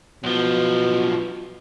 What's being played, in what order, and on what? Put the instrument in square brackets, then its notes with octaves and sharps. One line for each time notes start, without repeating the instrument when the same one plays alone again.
[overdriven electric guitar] B1 F3 [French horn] B2